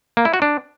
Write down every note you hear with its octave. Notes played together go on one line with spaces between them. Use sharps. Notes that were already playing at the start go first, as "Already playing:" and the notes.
A#3
E4
F#4
D4